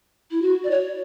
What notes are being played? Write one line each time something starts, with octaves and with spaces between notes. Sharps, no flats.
E4
F#4
D5
C#5